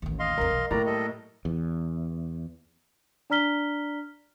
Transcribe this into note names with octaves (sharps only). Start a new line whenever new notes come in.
A1 D#2
D#5 F5 C6
A#1 F2 A#4
B1 E3
A2 F#3 A#3 A#4 D5 A#5
G3 A4 D#5
E2
D4 D5 A#5 F6 B6 G7